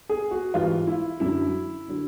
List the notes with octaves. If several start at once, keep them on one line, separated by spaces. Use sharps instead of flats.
G#4
F#4
G#2 E3 G3 F4
E4
F#2 D3 F#3 E4
D3 F#3